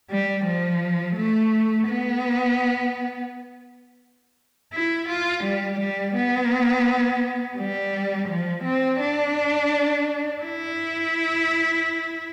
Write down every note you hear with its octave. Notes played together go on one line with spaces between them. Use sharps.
G3
F3
A3
B3
E4
F4
G3
G3
B3
G3
F3
C4
D4
E4